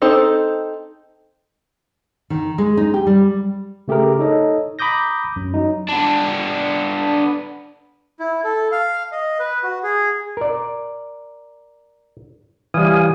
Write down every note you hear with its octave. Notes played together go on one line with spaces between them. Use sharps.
C4 D#4 A4 C5
D#3
G#3
D#4
G4
G3
C#3 A3 G4 G#4 A#4
D#4 A4 C#5 D#5
A#5 B5 D6 D#6 G6 A#6
F#2
F#3 D#4
B3 D4
E4
A4
F5
D#5
B4
F#4
G#4
A#4 D5
E3 G3 F5 G#5 D#6